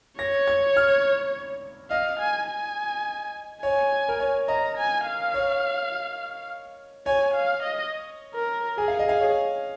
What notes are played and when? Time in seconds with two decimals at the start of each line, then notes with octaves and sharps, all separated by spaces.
0.19 C#5 A#6
0.47 G#6
0.77 F6
1.90 D#5 F5
2.20 G#5
2.48 G#5
3.63 C#5 G#5
4.09 A#4
4.20 C#5
4.48 D#5 A#5
4.78 G#5
5.06 F5
5.34 C#5
7.06 C#5 G#5
7.34 F5
7.63 D#5
8.35 A#4
8.77 G#4 G#5
8.88 F5
8.99 D#5
9.06 G#4 F5
9.20 C#5